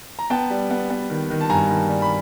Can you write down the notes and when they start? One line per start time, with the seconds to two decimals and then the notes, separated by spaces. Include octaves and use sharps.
0.19 A#5
0.30 B3 G5 A5
0.50 G3
0.70 B3
0.90 B3
1.10 D#3
1.30 D#3
1.41 A5
1.50 G2 G#5 A#5
1.70 D#3
1.89 G3
2.02 B5